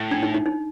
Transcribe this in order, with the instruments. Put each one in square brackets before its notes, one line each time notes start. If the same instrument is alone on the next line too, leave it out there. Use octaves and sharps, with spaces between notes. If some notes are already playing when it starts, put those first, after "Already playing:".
Already playing: [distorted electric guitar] A2
[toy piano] D4
D#4
D#4
D#4